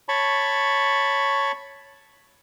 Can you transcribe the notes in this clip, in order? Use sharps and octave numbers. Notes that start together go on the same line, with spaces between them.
C#5 A5 B5 C#6